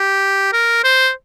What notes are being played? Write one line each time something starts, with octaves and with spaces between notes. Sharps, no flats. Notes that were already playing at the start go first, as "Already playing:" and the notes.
Already playing: G4
A#4
C5